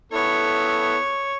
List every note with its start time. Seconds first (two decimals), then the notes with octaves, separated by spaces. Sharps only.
0.12 B3 E4 A4 C#5